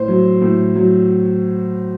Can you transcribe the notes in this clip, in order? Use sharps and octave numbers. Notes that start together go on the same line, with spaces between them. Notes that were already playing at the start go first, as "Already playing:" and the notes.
Already playing: A2 C5
F#3
A2
F#3